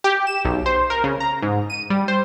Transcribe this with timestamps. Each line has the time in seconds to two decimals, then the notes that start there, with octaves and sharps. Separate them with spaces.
0.04 G4
0.27 E7
0.45 B1
0.66 C5
0.90 A#4
1.04 C#3
1.20 A#5
1.42 G#2
1.70 D#7
1.90 G3
2.08 C5